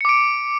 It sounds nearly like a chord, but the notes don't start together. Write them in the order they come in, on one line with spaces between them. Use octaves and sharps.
C#7 D6 D7